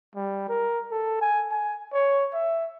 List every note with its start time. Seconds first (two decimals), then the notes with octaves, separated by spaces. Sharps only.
0.15 G3
0.49 A#4
0.91 A4
1.21 G#5
1.51 G#5
1.93 C#5
2.33 E5